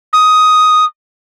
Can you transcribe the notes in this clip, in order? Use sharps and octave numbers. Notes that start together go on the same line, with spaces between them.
D#6